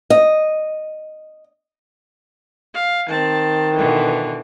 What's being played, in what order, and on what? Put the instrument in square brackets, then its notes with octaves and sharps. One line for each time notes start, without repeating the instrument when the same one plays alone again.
[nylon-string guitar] D#5
[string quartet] F5
[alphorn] D#3 [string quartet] C4 A5
[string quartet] B2 D3 E3